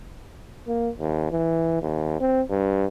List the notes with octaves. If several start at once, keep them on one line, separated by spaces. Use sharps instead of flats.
A#3
D#2
E3
D#2
C4
G2